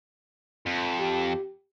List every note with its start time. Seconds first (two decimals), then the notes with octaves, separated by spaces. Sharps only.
0.66 F2
1.00 G4